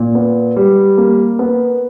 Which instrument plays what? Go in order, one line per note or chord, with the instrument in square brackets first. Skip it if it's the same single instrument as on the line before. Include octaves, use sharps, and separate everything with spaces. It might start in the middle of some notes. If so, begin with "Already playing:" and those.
Already playing: [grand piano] A#2
B3
G3
A#3
B3